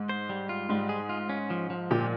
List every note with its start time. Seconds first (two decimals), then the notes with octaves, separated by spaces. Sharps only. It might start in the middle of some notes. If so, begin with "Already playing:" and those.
Already playing: G#2
0.09 C5
0.29 G3
0.49 F4
0.69 G#2 G3
0.89 G#4
1.09 F4
1.29 C#4
1.50 F3
1.70 F3
1.91 A#2 G4